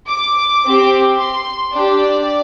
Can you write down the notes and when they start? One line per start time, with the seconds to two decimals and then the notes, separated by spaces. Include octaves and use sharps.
0.08 D6
0.63 C4 G4
1.18 C6
1.72 D4 G4 D5